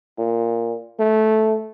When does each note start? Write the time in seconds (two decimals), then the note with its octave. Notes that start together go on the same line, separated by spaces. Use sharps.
0.18 A#2
0.99 A3